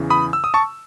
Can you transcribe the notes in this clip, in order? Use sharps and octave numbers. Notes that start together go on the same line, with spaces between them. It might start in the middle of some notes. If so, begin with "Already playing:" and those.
Already playing: E2 C#3 E3
B5 D#6
E6
D#6
A5 C#6